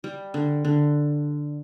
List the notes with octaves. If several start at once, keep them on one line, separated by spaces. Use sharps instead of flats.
G3
D3
D3